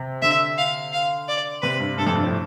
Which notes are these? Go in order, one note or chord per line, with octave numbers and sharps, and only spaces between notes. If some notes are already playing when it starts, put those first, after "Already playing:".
Already playing: C3
D3 E5
F5
F5
D5
C3 B4
G2
G2 A4
F2
G2
A2